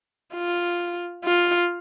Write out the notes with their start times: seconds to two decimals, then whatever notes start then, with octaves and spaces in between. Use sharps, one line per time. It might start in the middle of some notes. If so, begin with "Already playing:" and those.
0.34 F4
1.24 F4